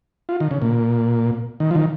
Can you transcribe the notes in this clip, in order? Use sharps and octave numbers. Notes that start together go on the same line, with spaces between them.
F4
D#3
C#3
A#2
D#3
F3
D#3